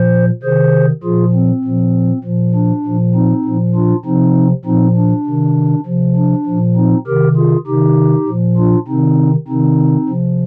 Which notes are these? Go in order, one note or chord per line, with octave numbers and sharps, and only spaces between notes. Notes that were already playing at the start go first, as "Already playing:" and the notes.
Already playing: A#2 F3 C5
C3 D#3 G#4 C5
A#2 F3 F4 G#4
C4
A#2 F3
A#2 F3
D4
A#2 F3
C4 D#4
A#2 F3
D4 F4
C3 F3 C4 D#4
A#2 F3 C4 D#4
D4
C3 D#3
C3 F3
D4
A#2 F3
C4 D#4
C3 D#3 G4 A#4
F4 G#4
C3 D#3 D#4 G4
A#2 F3
D4 F4
C3 D#3 C4 D#4
C3 D#3 C4 D#4
C3 F3